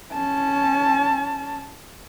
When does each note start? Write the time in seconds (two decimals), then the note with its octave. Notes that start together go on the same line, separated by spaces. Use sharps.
0.12 C#4 A5